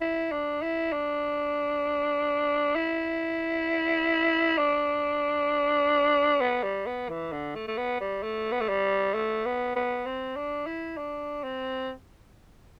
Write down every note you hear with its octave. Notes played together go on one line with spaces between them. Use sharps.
E4
D4
E4
D4
E4
D4
B3
G3
B3
E3
D3
A3
A3
B3
G3
A3
B3
A3
G3
A3
B3
B3
C4
D4
E4
D4
C4